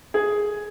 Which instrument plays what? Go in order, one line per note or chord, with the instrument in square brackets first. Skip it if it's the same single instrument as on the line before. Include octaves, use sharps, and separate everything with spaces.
[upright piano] G#4